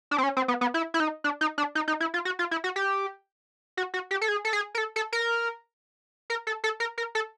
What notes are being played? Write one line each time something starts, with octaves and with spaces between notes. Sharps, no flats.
D4
C4
C#4
C4
B3
B3
E4
E4
D#4
D4
D#4
D4
D#4
D#4
E4
F4
F#4
F4
E4
F#4
G4
F#4
F#4
G4
A4
G#4
A4
G#4
A#4
A4
A4
A#4
A#4
A4
A4
A#4
A#4
A4